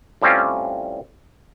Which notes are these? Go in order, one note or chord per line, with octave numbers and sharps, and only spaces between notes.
A2 G3 C4 C#4 F4